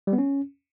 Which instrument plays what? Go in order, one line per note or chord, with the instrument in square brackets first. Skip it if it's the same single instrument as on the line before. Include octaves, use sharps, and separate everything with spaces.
[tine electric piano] G3
B3
C#4